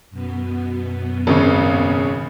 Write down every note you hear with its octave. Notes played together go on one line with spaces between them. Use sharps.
F#2 B2 B3
G#1 C#3 C#4